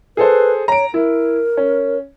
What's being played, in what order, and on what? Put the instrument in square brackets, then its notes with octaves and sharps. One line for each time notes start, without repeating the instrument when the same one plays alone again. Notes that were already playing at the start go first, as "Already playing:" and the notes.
[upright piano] G#4 A4 C5 [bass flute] B4
[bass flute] C#5 [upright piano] A#5 D7
[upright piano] E4 [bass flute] A#4
[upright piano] C#4